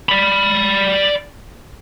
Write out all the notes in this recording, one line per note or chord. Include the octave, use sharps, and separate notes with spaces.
D5 B5